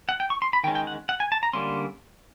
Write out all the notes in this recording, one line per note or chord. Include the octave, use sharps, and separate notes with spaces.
F#5
G5
C#6
C6
B5
D#3 G#3 C#4 G5
G5
F#5
F#5
G#5
A5
A#5
D3 G3 A#3 C#4 C6